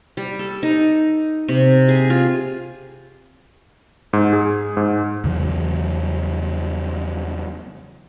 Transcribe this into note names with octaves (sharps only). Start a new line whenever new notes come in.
G3
A4
D#4
C3
G#4
F4
G#2
G#4
G#2
E2 C#3 E3 F#3